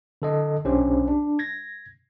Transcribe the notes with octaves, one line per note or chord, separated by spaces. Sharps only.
D3 A4 D#5
B1 C#4 D4 G4 C5
D4
G#6 A#6